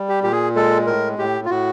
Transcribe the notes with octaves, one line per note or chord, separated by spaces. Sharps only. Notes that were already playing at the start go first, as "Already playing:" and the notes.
Already playing: G3
G4
A#2 G4
G#4
G#3 A4
A2 A#4
A2 G4
F4
A2 F#4